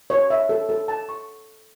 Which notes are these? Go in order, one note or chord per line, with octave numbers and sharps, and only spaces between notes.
C#5
E5
A4
A4
A5
C#6